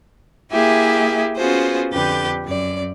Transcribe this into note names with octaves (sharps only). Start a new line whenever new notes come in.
A#3 E4 G4 G#4 E5 G#5
B3 C#4 F4 F#4 G#4 C5
F2 D3 G4 B4 G6 A6
F#2 D5